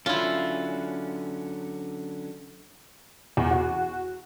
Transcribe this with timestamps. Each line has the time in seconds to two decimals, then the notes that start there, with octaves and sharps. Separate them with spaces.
0.06 D3 F#3 C#4 E4 F4
3.37 E2
3.51 F#4